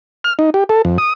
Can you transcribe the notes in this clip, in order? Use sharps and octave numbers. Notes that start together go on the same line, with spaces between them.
F6
D#4
G4
A4
F2
D#6